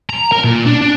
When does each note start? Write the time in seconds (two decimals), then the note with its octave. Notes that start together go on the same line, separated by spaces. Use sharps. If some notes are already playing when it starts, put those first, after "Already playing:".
0.10 A#5
0.32 A#4
0.44 A#2
0.66 D4
0.82 D4